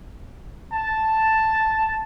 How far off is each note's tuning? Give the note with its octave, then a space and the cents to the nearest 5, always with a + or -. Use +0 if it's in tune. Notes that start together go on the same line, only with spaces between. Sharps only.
A5 +0